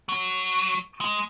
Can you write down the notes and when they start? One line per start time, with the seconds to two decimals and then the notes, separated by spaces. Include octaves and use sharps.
0.09 F#3
1.01 G#3